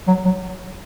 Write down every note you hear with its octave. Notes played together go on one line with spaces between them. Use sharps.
F#3
F#3